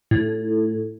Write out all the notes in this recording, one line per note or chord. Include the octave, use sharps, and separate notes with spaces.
A2